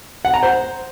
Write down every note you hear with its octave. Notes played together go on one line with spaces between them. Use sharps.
F#5
A#5
C5